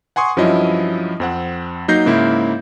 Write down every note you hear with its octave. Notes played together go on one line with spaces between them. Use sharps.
F#5 G#5 C6 C#6 D#6
G2 F3 F#3 C#4 E4 D#5
F2 C4 F#5
F#3 A#3 D#4 G6 A#6 C7
G#2 C#3 A#3 E4